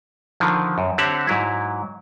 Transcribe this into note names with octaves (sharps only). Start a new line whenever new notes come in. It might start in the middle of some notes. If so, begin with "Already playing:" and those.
D3 D#3 F3
F#2
D3 C4 G4 C#5 E5 F#5
G#2 F#3 E4